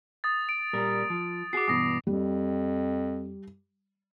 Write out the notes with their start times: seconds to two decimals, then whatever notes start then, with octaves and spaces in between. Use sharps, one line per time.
0.24 D#6 A6
0.49 D7
0.73 A#2 G3 A#4
1.10 F3
1.53 F#4 G#4 D6 C7
1.68 G2 B2 E3 D6 D#6 A#6
2.07 F2 G3